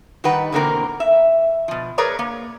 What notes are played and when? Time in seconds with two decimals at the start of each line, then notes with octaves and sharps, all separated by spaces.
0.24 D#3 G3 D#4 G4 B4 F#5
0.52 E2 B2 D3 A#3 C4 A#4
1.00 E5
1.68 B2 F3
1.98 G#4 A#4 B4 C#5 D5 A#5
2.19 A#3